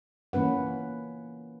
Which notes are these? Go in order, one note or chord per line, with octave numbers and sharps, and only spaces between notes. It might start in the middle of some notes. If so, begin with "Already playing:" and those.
E3 A#3 C#4 B4 F#5